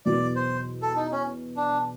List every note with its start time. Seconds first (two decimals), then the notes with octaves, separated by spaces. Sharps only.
0.05 E2 B2 F#3 B3 D5
0.36 C5
0.82 A4
0.96 D#4
1.12 C#4
1.57 D4